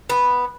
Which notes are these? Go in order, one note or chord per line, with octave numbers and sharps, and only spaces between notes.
B3